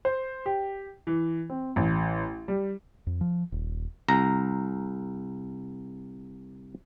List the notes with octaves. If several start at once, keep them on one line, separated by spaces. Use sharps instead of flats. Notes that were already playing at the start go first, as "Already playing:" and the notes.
C5
G4
E3
C4
A1
G3
F2
F3
D#1
C2 A#5